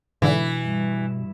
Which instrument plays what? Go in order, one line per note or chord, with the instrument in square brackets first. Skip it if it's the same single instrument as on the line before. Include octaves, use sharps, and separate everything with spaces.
[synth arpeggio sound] G#2 D3 [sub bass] B2 [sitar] E3
[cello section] G2